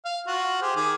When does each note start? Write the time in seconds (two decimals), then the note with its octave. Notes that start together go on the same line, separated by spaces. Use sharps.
0.05 F5
0.27 F4 F#4
0.62 G4 G#4 C5
0.76 D#3 G#4 D6